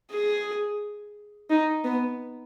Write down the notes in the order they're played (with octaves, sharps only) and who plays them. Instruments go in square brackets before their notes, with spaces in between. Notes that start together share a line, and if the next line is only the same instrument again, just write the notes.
[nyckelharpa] G#4
D#4
B3